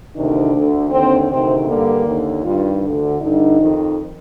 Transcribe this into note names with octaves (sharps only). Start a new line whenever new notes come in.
D2 C3 D#3 D4
D2 D3
D#2 D3 C4
D2 C3 D#3 C4
G2 D3 A#3
D#2 D3
G2 D#3 F4
D2 D3
G2 D3 D#4
F2 D#3